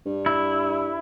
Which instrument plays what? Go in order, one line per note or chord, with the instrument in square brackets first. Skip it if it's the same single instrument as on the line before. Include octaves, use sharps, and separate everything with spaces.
[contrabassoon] G2
[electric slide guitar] E4